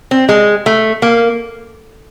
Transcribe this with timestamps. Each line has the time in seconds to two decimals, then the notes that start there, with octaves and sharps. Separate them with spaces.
0.11 C4
0.29 G#3
0.66 A3
1.02 A#3